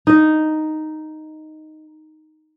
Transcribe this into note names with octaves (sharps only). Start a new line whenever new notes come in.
D#4 D#5